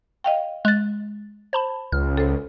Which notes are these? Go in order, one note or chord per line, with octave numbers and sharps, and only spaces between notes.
D#5 F5 G5
G#3 F#6 A6
C5 A5 B5
C#2 F6
A4 C5